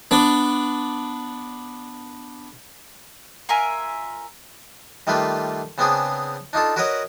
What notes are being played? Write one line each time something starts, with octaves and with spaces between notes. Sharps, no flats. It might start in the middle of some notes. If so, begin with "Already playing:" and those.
B3 D4
F4 A#4 E5 G#5
D#3 G3 A3 A#3 F4 B4
C#3 B3 C4 D4 G#4
D4 D#4 F4 A4
F#4 A#4 B4 C#5 D#5 F#5